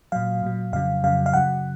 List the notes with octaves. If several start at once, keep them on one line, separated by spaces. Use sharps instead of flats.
A#2 F#3 F5
A#2 F#3
F2 C#3 F#3 F5
F2 C#3 F#3 F5
F5
F#2 C#3 F#3 F#5